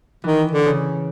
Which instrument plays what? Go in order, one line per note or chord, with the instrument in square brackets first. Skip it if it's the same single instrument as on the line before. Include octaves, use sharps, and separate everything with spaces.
[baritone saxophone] D#3 [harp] E3
[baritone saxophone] D3
[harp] C#3